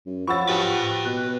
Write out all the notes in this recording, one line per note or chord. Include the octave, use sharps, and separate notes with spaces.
F#2
F3 C#5 F#5 B5 C#6 E6 A6
F#4 G4 B4 A5
B2 F#6